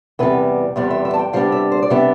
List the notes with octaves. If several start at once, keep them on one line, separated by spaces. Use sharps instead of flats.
E2 C3 G3 B3 B4
E2 C3 G3 B3 D5
E5
E5
A5
G5
C3 G3 B3 D4 F5
E5
C5
D5
C3 G3 B3 D4 E5